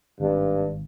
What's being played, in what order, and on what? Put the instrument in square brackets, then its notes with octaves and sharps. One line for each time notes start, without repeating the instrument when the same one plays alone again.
[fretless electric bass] G#1 [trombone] G2